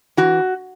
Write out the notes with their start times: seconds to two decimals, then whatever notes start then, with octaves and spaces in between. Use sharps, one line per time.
0.17 E3 F#4